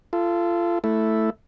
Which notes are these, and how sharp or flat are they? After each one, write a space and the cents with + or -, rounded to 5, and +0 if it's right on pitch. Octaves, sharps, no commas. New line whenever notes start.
F4 -25 A4 +0
A3 +0 E4 +0 A4 +0